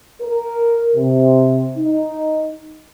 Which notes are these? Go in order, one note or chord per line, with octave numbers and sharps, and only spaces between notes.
A#4
C3
D#4